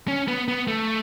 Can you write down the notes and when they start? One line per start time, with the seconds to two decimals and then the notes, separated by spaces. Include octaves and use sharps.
0.08 C#4
0.28 B3
0.48 B3
0.68 A3